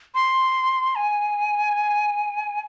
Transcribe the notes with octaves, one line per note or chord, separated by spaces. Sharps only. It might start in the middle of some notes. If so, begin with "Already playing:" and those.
C6
G#5